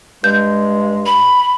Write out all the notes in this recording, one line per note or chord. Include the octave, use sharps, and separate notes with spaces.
G2 G#3 G6
B5